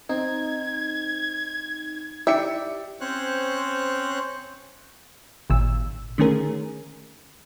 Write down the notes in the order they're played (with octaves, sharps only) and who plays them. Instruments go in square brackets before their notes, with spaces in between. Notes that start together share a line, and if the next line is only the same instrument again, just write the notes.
[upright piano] C4 [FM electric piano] D#4 [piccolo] G#6
[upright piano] E4 D5 C#7 [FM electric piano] G4 [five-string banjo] E5
[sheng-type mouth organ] C4 C#4 C5 C#5 F#6
[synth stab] G#1 D#2 A#2 E6
D3 D#3 A3 C#4 G#4 A#4